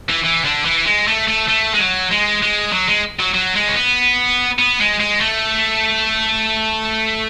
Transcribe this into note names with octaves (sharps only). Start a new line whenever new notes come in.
E3
E3
D3
E3
G#3
A3
A3
A3
G#3
F#3
G#3
G#3
F#3
G#3
F#3
F#3
G#3
C#4
B3
B3
G#3
G#3
A3